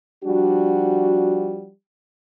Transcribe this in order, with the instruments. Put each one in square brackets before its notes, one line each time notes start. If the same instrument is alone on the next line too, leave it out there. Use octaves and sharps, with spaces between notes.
[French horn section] F3 G3 D4 F#4